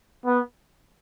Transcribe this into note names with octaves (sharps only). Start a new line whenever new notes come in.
B3